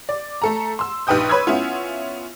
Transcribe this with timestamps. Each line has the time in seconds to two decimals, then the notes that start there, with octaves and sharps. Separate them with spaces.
0.09 D5
0.42 A3 A4 A#5
0.79 C6 E6
1.07 A#1 D#4 B4 G5 D#6 G6
1.29 B4 C#5 B5 C6 E6 G#6
1.47 B3 C#4 E4 F4